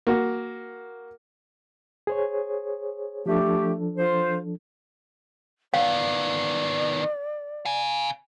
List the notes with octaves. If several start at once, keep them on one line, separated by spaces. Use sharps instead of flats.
A#3 F#4
G#4 C5 C#5
F3 A3 D4 G4 A4
F4 C5
D#3 B3 D5 F5
F5 G#5